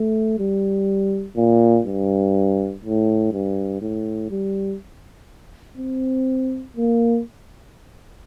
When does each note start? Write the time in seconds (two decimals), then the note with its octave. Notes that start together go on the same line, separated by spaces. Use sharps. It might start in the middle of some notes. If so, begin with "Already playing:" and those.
Already playing: A3
0.39 G3
1.37 A#2
1.87 G2
2.85 A2
3.33 G2
3.82 A2
4.31 G3
5.78 C4
6.77 A#3